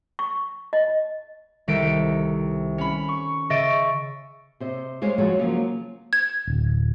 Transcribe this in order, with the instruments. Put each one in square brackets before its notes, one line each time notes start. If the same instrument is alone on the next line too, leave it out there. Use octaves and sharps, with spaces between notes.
[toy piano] C#6
D#5
[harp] C2 D#3 A4 B6 D7
C#4 B5
C#6
C#3 D#5 E5 C#6 A6 D7
[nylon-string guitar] C3 C5 D#5
G3 G#3 C5 C#5 D#5 F5
F3 G#3 A3 F#4 C#5
C#3 F3 F#3 A#3
[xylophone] G#6
[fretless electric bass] D1